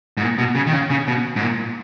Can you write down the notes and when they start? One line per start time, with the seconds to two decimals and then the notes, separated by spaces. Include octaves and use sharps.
0.17 G#2
0.22 A#2
0.38 B2
0.55 C#3
0.67 D#3
0.73 C#3
0.90 C#3
1.08 B2
1.36 G#2
1.41 A#2